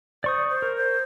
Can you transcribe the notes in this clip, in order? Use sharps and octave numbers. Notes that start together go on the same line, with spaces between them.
C5 D5 C#6 D#6
C5
A#4
C5